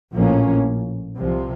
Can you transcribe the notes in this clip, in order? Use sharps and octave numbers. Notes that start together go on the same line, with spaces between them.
A#1 A2 F3 A#3 C#4
C2 C3 F3